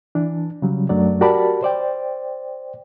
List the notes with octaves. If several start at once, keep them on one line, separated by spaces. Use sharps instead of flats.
E3 D4
C#3 F#3 G3
F#2 F#3 A3 D4 D5
F#4 G4 A#4 D5 A5 B5
C5 D5 G5